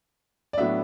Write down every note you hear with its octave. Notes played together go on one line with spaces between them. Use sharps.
D5
A2 F#3 B3 D4 E5